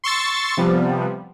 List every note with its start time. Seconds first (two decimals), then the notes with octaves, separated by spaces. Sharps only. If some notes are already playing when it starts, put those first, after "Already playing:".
0.04 C6 C#6 E6 A6
0.57 C3 F3 G3 B3